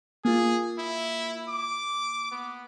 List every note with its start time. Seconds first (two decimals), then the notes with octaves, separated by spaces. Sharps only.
0.25 A#3 F4 G#4
0.78 E4
1.49 D6
2.31 B3